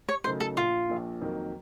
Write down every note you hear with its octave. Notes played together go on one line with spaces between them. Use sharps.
C#5
C#3 F#3 A3 D#4 A#4 C5
A4
A#1 A#2 F3 F4
A#1 A#2 F3
F2 D#3 F#3 A#3